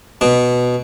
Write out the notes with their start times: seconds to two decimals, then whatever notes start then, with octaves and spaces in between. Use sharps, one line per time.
0.21 B2